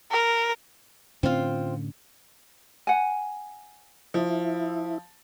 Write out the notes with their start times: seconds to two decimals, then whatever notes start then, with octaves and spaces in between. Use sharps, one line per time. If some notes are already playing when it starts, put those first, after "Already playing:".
0.12 A#4
1.23 A2 D3 C4 C#4 F4
2.87 F#5 G#5
4.14 F3 E4